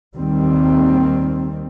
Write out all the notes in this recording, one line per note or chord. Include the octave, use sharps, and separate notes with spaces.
D#2 D#3 G3 C4